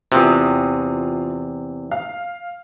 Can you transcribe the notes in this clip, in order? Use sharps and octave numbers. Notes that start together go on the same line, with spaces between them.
E2 C3 F4 D#6
F5